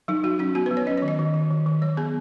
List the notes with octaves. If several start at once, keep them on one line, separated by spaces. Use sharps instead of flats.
F#3 D#4
F#3 F#4
C#4 F#4
B3 F#4
F#3 B4
C#5
C#4 D#5
D#3 C#5
D#5
D#3
D#3
D#3
D#3
F#3 C#5
B3 G#4